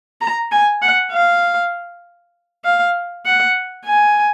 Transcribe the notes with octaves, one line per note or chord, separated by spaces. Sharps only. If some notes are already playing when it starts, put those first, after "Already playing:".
A#5
G#5
F#5
F5
F5
F#5
G#5